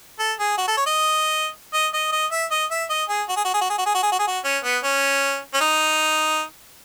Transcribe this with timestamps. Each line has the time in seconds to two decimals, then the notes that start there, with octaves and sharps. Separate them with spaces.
0.19 A4
0.39 G#4
0.58 F#4
0.68 A4
0.77 C#5
0.86 D#5
1.74 D#5
1.94 D#5
2.12 D#5
2.32 E5
2.51 D#5
2.71 E5
2.90 D#5
3.09 G#4
3.29 F#4
3.37 G#4
3.45 F#4
3.54 G#4
3.61 F#4
3.70 G#4
3.78 F#4
3.86 G#4
3.95 F#4
4.03 G#4
4.12 F#4
4.19 G#4
4.28 F#4
4.44 C#4
4.64 B3
4.84 C#4
5.54 C#4
5.61 D#4